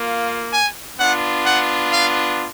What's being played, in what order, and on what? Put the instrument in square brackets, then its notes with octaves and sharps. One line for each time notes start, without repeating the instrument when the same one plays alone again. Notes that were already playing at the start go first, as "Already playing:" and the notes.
Already playing: [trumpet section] A#3 F4
G#5
B3 D4 F4 F#5
F#5
F5